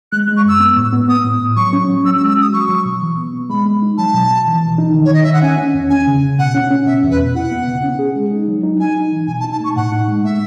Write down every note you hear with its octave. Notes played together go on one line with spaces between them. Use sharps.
G#3 F#6
G#3
C#6
F#2 E6
B3
A2
B3
B3 D#6
A2
A2
F#3 C#6
C#4
F#3
C#4 E6
E6
G#3
E6
F#4 D#6
F#3 C#6
F#3
B2
E3
B3
B3
G#3 B5
G#3
D#4
F#3 A5
B2
B2
E3
E3
D#4
D#3
C#5
D#3 D#5
D#3 E5
F#5
C#4 G#5
C#4
E2
C#4 G#5
C#3
C#3
B2 F#5
C#4
C#4
B2 E5
E2
B4
B2
E4 F#5
B3
C#3
C#4
G#4
G#3
D#4
F#3
D#4
D#4 G#5
D#4
E3
B2 G#5
A5
D#4
A5
A3 C#6
A2 F#5
D#4
G#3
A3 E5